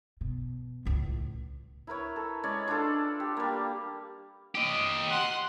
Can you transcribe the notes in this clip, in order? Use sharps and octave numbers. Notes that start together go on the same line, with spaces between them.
B2
C#2 A2
E4 A#4 B4 C#5
A4
G#3 C#4 C#5 D5
D4 F4 A4
G4
G3 A#3
G4 D#5
F#5 C6